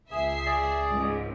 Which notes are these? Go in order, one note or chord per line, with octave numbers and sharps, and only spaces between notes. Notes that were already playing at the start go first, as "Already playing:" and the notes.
C#2 G#4 E5 C7
G#4 D5
C#2 G#2